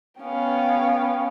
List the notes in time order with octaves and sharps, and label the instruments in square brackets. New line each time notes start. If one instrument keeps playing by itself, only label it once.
[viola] B3 C#4 [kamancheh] F5 G5